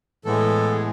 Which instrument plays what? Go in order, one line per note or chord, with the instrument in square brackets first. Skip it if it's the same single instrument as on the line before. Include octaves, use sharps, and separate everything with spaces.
[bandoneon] A2 E3 G#3 B3 A4
G#4